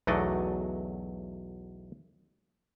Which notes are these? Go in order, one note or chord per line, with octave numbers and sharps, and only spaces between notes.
B1 E2 F#3 A3 D5 D#5